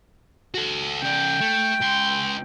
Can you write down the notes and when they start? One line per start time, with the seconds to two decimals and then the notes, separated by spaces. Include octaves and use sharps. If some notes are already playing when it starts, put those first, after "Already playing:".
0.54 F#4 A4
1.02 C#3 D5 G5
1.41 A3
1.81 C#2 C6